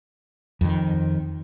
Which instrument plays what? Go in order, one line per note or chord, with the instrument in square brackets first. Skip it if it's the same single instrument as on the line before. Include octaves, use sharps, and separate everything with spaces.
[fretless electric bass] F2 D#3